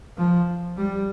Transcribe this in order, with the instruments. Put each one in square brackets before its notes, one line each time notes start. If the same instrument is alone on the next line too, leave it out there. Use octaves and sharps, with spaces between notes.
[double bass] F3
G3